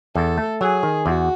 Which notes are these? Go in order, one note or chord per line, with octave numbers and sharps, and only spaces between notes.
E2 A4
A3
F#3 G#4
D#3
E2 F#4